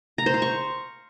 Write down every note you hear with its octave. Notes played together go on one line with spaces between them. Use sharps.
A#5
C5
F5
C#6